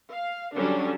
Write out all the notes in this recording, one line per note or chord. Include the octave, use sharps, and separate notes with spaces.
F5
D3 F#3 G3 C#4 D4